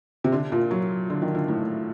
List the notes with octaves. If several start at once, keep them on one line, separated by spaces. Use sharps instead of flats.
C3
D3
A#2
F#3
D3
D#3
D3
A2